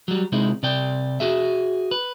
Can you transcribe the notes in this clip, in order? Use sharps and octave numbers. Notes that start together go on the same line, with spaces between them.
F#3 G3
C3 G#3 D#4 E4
C3 D5 G5
F#4 G#4 E5
B4